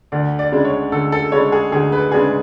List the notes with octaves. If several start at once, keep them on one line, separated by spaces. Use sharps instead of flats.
D2 D5
D5
C#3 G#3 D4
C#5
D2 A4
A4
C#3 G#3 D4 C#5
G#4
D2 G#4
B4
C#3 G#3 D4 G#4